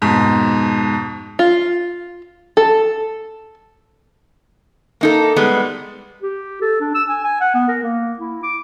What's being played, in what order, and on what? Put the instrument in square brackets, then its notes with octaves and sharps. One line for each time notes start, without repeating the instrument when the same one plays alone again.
[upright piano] F2 G#2 B2
[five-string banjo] F4
A4
[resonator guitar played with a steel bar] A#3 D#4 A4
G3 G#3 B3
[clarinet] G4
A4
D4
E6
G#5
G#5
F#5
B3
A#4
A#3
E4
D6